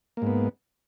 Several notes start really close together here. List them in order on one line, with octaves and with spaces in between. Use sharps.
A#3 G#2 B3